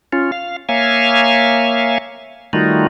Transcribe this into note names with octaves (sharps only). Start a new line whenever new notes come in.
C#4 F4
F5
A#3 C#5 E5 F5 G#5
D#3 G3 A3 D#4 F4 F#4